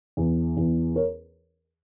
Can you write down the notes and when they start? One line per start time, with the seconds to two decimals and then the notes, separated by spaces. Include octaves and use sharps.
0.17 E2
0.57 E2
0.96 A#4 C#5